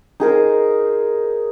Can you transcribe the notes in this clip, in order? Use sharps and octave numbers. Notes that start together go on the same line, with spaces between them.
D#4 G#4 A#4 C5